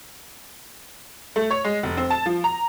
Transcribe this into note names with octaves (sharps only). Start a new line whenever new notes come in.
A3
C#5
G#3
F1
C4
A5
F3
A#5